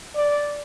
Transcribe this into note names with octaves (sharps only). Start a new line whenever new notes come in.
D5